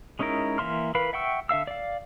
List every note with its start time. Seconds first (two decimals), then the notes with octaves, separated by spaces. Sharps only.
0.19 G#3 C#4 D#4 E4 A#4
0.58 E3 A#3 E5 C6 F6
0.95 E3 A#4 B4 F5 B5
1.13 E5 F#5 G5 C#6 E6
1.49 D3 E5 F5 E6
1.67 D5 F5